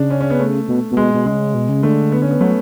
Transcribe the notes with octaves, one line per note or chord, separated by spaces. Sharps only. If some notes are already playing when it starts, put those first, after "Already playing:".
Already playing: C#3 D4
C#4
C#4
B3
A3
B2
B2
G#3
B2
C#3 G#3
B2
C#3
D3 A3
B3
C#4
B3
F#3 A3